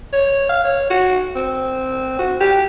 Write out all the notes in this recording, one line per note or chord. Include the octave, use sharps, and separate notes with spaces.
C#5
F5
C#5
F#4
C4
F#4
G4